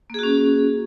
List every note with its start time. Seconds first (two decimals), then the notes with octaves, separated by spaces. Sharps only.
0.10 A#3
0.14 G#4
0.19 F#4
0.23 C#4